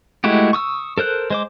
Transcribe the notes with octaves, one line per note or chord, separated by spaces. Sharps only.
G#3 A3 E4 F#4 G4
C#6 D#6 E6
A4 A#4 C5 F#6
G#3 C5 D6